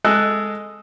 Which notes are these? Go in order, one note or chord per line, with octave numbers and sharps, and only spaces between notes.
G#3 A4 D#5 E6 F#6